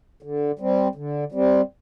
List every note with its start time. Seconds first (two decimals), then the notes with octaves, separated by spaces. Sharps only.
0.23 D3
0.59 G3 C4
0.95 D3
1.32 G3 C4